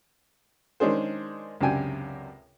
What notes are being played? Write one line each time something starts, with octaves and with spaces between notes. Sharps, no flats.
D#3 G#3 C#4 D4 G#4 C5
C#2 F#2 C3 D4 G5 G#5